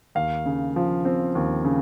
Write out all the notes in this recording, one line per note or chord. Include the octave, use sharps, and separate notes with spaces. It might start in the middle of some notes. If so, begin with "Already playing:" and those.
D#2 F5
C#3
F3
C4
D#2
C#3